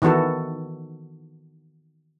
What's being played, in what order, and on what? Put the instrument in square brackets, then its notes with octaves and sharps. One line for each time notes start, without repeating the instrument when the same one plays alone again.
[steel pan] D#3 E3 B3 F#4 A4